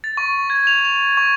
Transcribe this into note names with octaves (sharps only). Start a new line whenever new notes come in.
A6
C#6
G#6
F7
F7
C#6